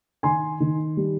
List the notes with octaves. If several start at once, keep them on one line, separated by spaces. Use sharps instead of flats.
D#3 G#5 C6
D#3
G3